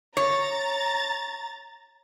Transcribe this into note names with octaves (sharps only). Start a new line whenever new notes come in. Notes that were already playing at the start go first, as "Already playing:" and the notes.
C#5 A#5 A6